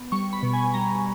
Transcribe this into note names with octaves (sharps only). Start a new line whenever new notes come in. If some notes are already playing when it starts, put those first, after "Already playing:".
Already playing: B3
G3 C#6
B5
B2
G#5
G3 A#5